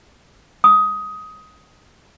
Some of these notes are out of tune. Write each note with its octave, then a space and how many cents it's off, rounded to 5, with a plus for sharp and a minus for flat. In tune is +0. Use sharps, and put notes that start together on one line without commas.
D#6 +15